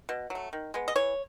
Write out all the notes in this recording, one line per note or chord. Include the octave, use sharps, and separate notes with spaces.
B2
F#3 A3
D#3
G#3 B3
D#5
E3 C#5